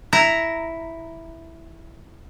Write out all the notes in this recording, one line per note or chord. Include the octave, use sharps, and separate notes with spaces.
E4 A#5